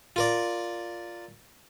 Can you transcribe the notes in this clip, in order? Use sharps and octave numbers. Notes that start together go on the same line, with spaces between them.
F4 A#4 D5